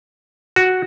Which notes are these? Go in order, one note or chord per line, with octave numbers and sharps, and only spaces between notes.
F#4